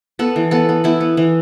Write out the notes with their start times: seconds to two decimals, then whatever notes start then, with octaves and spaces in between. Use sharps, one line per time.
0.19 B3 A4
0.36 E3
0.51 B3 A4
0.69 B3
0.84 B3 E4
1.01 B3
1.17 E3